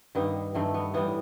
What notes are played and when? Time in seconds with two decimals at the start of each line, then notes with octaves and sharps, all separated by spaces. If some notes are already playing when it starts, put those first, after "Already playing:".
0.15 G2 D#3 G3 B3
0.54 G2 D#3 G3 A3
0.74 B3
0.94 A2 E3 G3 B3